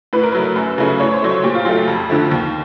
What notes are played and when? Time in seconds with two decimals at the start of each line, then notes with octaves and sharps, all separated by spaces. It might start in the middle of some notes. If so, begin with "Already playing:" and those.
0.13 A2 B4
0.23 A#4
0.32 F#3 A3 B4
0.56 F#2
0.78 C#3 F#3 A3
1.00 A2 C#5
1.13 C5
1.22 F#3 A3 C#5
1.44 A#2 G4
1.55 F4
1.65 F#3 A3 F4
1.87 F2
2.09 D3 F3 A3
2.31 D#2